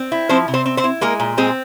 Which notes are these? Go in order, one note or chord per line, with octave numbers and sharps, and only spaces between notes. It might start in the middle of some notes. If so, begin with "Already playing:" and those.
Already playing: C4
E4
F3 C4 C5
C3
C4 C5
C4
C4 C5
E4
G#3 A#3 A#4
A#2
G#3 C4 G#4